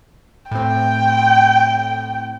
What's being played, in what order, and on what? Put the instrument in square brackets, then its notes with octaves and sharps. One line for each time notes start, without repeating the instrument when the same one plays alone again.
[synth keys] A2 C4 [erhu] G5